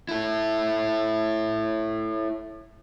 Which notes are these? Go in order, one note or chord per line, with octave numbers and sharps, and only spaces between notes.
E4 A4